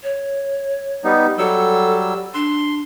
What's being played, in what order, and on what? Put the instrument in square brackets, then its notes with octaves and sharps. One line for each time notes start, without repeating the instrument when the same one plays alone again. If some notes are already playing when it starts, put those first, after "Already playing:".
[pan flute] C#5
[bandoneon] G3 B3 D#4
[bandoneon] F#3 G3 E6 [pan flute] A4
[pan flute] D4 [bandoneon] C6